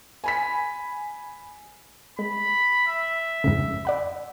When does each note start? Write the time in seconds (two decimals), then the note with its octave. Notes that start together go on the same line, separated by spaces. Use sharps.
0.24 G#5 B5 B6
2.19 G#3 B5
2.87 E5
3.44 F2 G#2 C#3
3.85 D5 F#5 B5